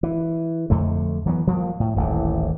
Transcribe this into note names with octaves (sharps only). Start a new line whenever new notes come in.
E3
F2 D3 A3
E3 F#3 G#3 B3
F3 G3 A#3
A2
D#1 A1 D#2 E3